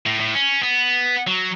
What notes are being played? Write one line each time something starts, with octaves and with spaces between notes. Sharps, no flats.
A2
A2
C#4
B3
F#3